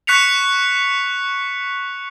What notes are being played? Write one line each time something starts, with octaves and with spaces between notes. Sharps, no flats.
C#6 F#6 B6 C#7 F7